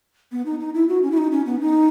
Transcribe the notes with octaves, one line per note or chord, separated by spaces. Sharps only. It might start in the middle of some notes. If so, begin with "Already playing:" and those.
B3
D#4
D#4
E4
F#4
C#4
E4
D#4
C#4
B3
D#4